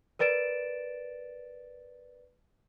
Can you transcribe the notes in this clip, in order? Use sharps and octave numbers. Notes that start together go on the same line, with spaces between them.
A#4 B4 D5 A6 D7 E7